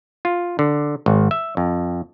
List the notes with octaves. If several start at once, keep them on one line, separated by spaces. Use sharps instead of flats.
F4
D3
G#1
E5
F2